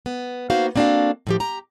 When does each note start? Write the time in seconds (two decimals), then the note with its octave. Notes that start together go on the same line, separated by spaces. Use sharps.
0.06 B3
0.50 A#3 B3 D#4 F#4 C5 F5
0.76 A#3 C4 D4 F#4 A4 F5
1.27 A2 F3 G4
1.40 G4 A#5